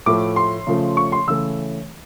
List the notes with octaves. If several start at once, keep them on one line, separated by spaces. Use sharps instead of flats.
A2 F3 A3 D6
C6
C#3 F3 A3
C#6
C6
C#3 E3 A3 E6